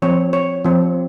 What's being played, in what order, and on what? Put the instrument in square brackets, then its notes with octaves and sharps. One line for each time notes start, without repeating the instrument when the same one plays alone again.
[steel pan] F3 C4 C#5
C#5
F3 C4